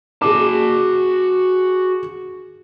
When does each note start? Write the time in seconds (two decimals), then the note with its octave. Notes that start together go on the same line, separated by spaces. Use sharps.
0.22 F#4 G#4 A5 D6